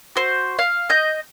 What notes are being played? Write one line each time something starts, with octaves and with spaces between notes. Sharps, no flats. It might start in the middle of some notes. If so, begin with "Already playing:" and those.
F#4 C5
F5
D#5 G6